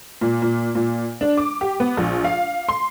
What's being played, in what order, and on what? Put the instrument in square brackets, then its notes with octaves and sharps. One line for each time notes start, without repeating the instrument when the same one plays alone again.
[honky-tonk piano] A#2
A#2
A#2
D4
D6
G4
B3
A#1
F5
C6